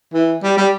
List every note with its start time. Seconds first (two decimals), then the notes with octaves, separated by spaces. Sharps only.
0.14 E3
0.43 G3
0.57 G3